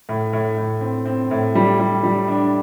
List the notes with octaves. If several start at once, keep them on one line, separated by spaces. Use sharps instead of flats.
A2
A2
A2
C4
C4
A2
G3
G3
G3
D4